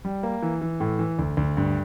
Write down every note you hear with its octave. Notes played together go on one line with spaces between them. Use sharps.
G3
A#3
E3
E3
A2
E3
D2
D2
G2